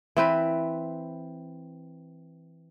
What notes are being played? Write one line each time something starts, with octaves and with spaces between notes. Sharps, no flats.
E3 C4 B4